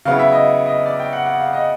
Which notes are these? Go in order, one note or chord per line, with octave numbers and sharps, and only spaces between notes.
C#3 F#3 B3 E4 F5
E5
D#5
D#5
D5
G5
F#5
F#5
F5
D#5